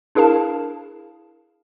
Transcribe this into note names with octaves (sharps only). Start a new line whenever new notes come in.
D4 E4 G#4 A#4 F5 A5